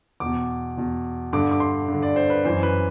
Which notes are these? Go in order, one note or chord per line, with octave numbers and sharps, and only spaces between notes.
E2 D6
B2
E2 B2
G2 D3 D6
D6
C6
G2 D3
D5
C5
B4
F#2 E3 C5
B4